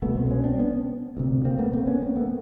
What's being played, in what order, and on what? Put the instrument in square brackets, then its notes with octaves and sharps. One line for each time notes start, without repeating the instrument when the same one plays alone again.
[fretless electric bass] C2 B2 A3 B3
A#3 C4
C4
B3 C#4
C4 D4
B3 C#4
D2 C3
A#3 C4
A3 B3
A#3 C4
B3 C#4
A#3 C4
A3 B3